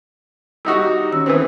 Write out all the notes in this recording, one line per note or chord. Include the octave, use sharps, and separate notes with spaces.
G3 D#4 F#4 C#6 D#6 E6
D#3 C#4 E6
E3 B3 C4